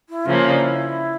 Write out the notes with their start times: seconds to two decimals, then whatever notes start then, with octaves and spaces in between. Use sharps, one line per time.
0.09 E4
0.25 C#3 F3 A#3 C#4 F4
0.50 D4
0.60 E4